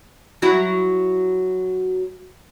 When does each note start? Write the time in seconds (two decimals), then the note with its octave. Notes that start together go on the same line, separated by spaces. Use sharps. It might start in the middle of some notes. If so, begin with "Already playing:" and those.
0.42 F#3 E4